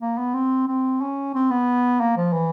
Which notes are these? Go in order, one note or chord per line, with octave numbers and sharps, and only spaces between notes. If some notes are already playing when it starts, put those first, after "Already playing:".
A#3
B3
C4
C4
C#4
C4
B3
A#3
F3
E3